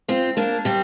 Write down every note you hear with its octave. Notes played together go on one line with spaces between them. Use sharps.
C4 F4
A#3 D4
G3 C4